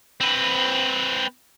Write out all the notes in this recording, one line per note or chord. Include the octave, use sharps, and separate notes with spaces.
C4 B4